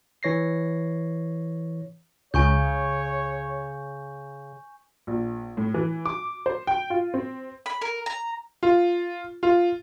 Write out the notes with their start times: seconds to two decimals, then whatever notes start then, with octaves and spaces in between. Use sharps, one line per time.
0.23 E3 C#5 A#6 C7
2.34 C#2 C#3 C#5 G#5 C#6 G6
5.07 A#1
5.57 A2
5.74 E3
6.06 D6
6.46 C5
6.67 G5
6.90 F4
7.14 C4
7.66 B5
7.81 A#4
8.06 A#5
8.63 F4
9.43 F4